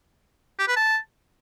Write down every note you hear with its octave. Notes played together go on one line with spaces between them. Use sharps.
G4
B4
A5